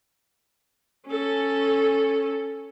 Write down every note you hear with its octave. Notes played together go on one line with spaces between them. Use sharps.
C#4 A4